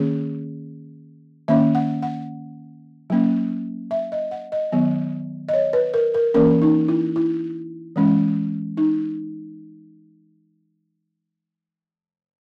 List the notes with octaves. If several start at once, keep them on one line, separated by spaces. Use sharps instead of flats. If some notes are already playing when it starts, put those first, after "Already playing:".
Already playing: D#3 A#3 C#4 G#4
D#3 A#3 C#4 E5
F#5
F#5
F#3 A#3 C#4
E5
D#5
F#5
D#5
D#3 F#3 B3
D#5
C#5
B4
A#4
A#4
E3 A#3 C#4 A#4
D#4
E4
E4
E3 G#3 C#4
D#4